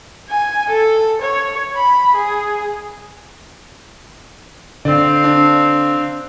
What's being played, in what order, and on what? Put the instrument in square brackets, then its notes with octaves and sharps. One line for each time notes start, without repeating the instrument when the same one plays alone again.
[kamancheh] G#5
A4
C#5
B5
G#4
[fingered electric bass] D3 [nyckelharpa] C4 F5 [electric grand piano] D5
[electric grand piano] D4